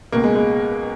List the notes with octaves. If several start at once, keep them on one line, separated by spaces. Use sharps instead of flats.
C#2 B2 A#3
G#3
G#3